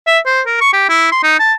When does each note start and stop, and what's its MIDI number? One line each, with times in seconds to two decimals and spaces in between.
0.07 0.19 76
0.26 0.41 72
0.46 0.60 70
0.61 0.73 85
0.73 0.85 67
0.89 1.08 64
1.12 1.21 84
1.23 1.35 63
1.40 1.53 81